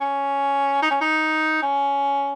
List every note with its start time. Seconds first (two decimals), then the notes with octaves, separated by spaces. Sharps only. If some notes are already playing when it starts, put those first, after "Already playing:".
0.01 C#4
0.82 D#4
0.91 C#4
1.01 D#4
1.62 C#4